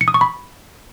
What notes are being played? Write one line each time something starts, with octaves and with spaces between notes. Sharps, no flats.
C#7
D#6
C#6
B5